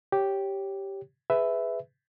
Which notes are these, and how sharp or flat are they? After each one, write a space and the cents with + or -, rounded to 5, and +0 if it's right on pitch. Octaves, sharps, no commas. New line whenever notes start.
G4 -5 C#5 +0
G#4 +0 B4 +15 E5 +0